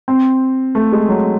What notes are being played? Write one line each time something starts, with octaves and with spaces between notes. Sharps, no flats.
C4
A3
G#3
F#3